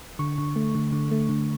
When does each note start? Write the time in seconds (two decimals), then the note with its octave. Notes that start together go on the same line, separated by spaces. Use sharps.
0.19 D3 C#6
0.38 D3
0.56 A3
0.75 D3
0.92 D3
1.11 A3
1.29 D3